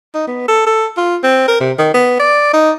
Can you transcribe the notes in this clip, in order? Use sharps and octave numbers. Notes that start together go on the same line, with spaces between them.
D#4
B3
A4
A4
F4
C4
A#4
C3
D#3
B3
D5
D#4